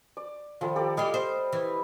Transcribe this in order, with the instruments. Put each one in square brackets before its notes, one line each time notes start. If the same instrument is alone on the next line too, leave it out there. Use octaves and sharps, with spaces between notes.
[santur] D5
[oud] D#3 [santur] F3 A4 B5
[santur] G4 A4 D5
[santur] G3 D#5 [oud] G#3 F4 G4
[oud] C5
E3